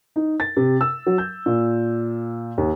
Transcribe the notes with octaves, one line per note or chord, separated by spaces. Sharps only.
D#4
A6
C3
E6
F#3
G6
A#2
D#2